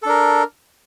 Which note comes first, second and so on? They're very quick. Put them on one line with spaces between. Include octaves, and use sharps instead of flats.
A4 D4 A#4